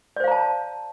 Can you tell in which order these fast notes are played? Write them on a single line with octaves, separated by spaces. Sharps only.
D5 C5 F5 A#5 A5